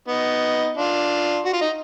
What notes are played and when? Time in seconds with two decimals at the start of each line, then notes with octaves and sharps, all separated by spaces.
0.08 B3 D#4
0.77 D4 F4
1.45 F#4
1.53 F4
1.61 D#4